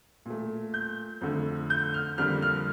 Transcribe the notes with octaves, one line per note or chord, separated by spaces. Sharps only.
A#2 A3
G6
F2 D3 A3
G6
F6
F2 D3 G3 A#3 F6
F6